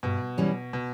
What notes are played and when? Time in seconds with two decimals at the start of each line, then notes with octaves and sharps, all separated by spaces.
0.03 G2 B2
0.38 E3 G3 C#4
0.73 B2